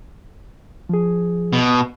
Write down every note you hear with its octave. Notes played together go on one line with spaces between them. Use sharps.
F3 G#4
B2